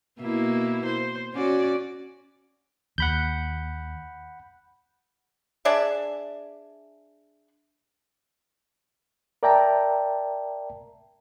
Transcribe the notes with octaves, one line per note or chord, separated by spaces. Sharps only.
B2 A#3 E4
C5
C#4 F#4 D5
D#2 F#5 B5 G6
D4 G#4 D5 E5
A#4 D5 E5 G5 A5 A#5